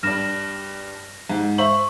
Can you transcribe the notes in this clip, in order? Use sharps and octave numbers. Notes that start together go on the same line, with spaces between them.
G2 D4 F6 A#6 E7
G#2
C5 E5 C#6 F#7